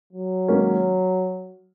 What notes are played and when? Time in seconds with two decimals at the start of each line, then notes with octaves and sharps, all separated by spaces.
0.13 F#3
0.48 G#2 D#3 A#3 C#4